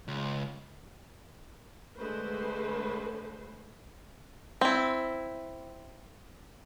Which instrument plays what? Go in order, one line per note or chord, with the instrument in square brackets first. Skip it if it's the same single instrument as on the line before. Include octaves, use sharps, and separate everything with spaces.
[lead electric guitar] C#2
[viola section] D3 G#3 A3 B4 C5
[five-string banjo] C4 E4